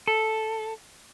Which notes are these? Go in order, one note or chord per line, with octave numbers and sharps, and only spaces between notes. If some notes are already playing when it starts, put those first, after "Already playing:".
A4